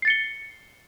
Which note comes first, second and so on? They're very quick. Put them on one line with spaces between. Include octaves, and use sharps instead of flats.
C7 A6 C#7 G7